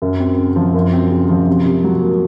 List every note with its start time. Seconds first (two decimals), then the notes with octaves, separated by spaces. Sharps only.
0.02 F#2
0.20 C4
0.38 C#3
0.56 F3
0.74 F#2
0.93 C4
1.11 C#3
1.29 F3
1.47 C3
1.65 C3
1.84 F#3
2.02 A#3